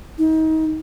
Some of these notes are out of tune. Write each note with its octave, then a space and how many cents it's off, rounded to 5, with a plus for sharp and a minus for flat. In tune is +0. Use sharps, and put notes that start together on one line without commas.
D#4 +30